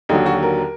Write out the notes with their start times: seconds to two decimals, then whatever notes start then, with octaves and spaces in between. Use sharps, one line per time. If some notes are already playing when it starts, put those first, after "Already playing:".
0.09 D#2 D3 F#3 D#4
0.26 F#4
0.43 A#4